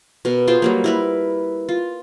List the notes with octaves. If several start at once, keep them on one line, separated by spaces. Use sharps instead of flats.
B2 A#4
F4 G#4 C5 G5
F#3 G3 A#3
E4 A#4 B4
F4